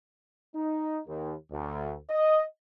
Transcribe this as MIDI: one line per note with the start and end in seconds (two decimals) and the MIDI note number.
0.55 0.99 63
1.07 1.34 39
1.52 1.95 38
2.10 2.44 75